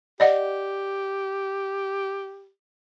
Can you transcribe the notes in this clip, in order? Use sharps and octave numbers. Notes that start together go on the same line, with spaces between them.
G4 D5 D#5 F#5